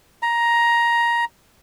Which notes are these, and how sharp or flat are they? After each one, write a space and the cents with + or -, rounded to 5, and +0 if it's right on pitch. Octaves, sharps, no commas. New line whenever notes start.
A#5 +10